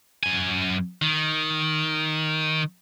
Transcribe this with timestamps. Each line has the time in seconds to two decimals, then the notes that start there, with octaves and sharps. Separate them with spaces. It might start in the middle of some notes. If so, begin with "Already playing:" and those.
0.23 F#2 G#5
1.02 D#3